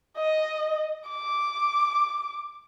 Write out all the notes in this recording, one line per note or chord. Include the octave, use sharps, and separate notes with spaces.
D#5
D6